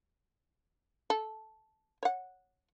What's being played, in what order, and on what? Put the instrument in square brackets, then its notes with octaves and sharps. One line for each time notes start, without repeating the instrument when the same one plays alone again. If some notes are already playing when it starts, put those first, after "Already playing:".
[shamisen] A4
C#5 F#5